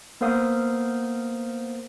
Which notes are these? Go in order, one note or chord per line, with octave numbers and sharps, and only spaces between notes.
A#3 B3 A#4 C5 F5 D#6